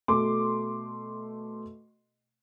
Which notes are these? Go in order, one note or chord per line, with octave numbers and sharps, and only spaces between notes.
B2 A3 C6 D6